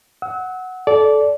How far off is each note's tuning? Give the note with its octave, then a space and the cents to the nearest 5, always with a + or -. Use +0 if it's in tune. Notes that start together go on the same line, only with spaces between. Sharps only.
F#5 +0 E6 -35
A4 -15 D5 -15